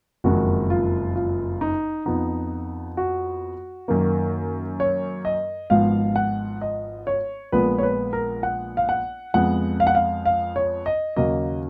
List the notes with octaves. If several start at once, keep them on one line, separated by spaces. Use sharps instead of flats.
F#1 F2 D#3 G#3 F#4
F4
F4
D#4
F2 F3 B3 D#4
F#4
F#2 D#3 A#3
C#5
D#5
G#1 G#2 F3 B3 F5
F#5
D#5
C#5
A#1 A#2 F3 G#3 B3 B4
C#5
B4
A#4
F#5
F5
F#5
F2 F3 G#3 B3 F#5
F5
F#5
F5
F5
C#5
D#5
D#2 C#3 F#3 A#3 D#5